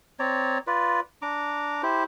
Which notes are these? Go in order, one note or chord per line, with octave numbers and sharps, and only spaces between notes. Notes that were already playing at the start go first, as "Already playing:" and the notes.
C4 C#5 D5 A#5
F4 B4 D5
D4 A#5 D6
E4 G4 C5